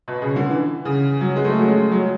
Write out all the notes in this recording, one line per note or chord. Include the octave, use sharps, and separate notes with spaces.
B2
C#3
D3
E3
C#3
F#3
G#3
A3
F#3
G#3
F#3